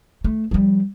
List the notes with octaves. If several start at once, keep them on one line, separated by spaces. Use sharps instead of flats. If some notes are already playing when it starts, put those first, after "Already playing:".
A3
F3 G3